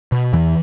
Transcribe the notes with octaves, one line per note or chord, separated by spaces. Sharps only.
B2
E2 E3